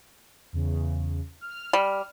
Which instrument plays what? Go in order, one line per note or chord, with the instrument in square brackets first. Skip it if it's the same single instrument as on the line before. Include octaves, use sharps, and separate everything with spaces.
[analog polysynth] E2 C#3
F6
[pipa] G3